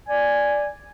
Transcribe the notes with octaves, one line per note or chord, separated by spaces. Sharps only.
D5 G#5